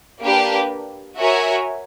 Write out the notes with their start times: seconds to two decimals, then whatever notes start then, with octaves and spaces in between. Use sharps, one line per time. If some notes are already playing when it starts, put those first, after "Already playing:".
0.20 A#3 D4 G4 B4
1.16 F#4 A#4 C#5 E5 G#5